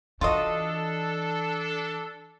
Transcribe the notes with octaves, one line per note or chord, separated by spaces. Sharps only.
E3 D4 F4 F#4 A4 D#5